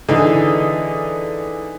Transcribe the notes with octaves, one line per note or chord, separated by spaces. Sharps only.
D3 E3 D#4 G#4